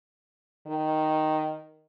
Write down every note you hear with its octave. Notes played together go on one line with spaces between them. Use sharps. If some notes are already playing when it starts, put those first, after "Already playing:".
D#3